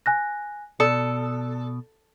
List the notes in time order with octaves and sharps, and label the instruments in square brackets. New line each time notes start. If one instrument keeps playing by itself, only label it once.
[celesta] G#5 F#6 A#6
[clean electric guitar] B2 [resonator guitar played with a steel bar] A4 [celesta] D5 D#6 C#7